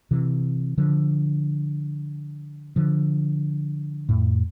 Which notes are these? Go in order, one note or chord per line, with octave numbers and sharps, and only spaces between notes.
C3 E3
D3 F3
D3 F3
F2 A2